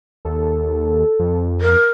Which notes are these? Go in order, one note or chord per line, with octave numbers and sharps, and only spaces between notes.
D#2 A4
F2
A#4